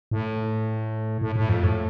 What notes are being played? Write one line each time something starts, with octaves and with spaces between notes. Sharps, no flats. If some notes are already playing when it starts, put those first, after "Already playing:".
A2
A2
A2
F2
A2